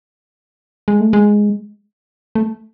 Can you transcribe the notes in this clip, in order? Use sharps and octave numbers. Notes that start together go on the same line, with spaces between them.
G#3
A3
G#3
A3